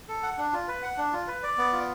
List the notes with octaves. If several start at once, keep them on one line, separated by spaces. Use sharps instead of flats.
A4
F#5
D4
F4
B4
F#5
D4
F4
B4
D5
B3
F4